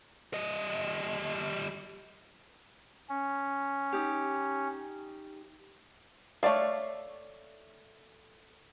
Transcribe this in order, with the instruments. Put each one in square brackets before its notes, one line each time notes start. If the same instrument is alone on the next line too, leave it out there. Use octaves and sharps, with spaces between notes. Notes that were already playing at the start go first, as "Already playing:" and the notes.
[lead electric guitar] G3 D#5
[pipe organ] C#4
[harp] D#4 G4
[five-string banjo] A3 C#5 D5 F5